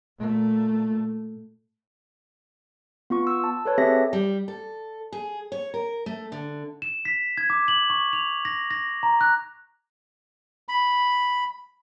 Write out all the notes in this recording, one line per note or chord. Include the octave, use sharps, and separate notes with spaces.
A#2 A3
B3 F4 C#6
E6
A5
A4 B4 C#5 A5
C4 G4 G#4 E5 A#6
G3
A4
G#4
C#5
A#4
A3
D3
E7
B6
G#6
D6
F#7
C#6
F7
A#6
A#6
A#5
F#6
B5